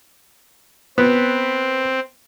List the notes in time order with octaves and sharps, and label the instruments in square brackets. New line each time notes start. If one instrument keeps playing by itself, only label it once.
[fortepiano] B3 [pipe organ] C4